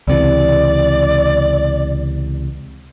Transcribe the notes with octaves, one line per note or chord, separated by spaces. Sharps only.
C#2 C3 E3 D5